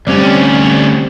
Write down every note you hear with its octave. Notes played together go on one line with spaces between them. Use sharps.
D2 G3 C4 C#4 D5